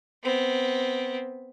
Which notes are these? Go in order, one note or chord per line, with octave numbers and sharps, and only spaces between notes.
B3 C4